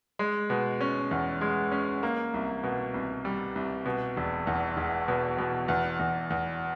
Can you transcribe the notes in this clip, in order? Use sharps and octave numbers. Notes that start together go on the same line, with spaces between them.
G#3
B2
C#4
E2
G#3
C#4
A#3
C2
B2
C2
G3
C2
B2
E1
E2
E1
B2
B2
E2
E2
E2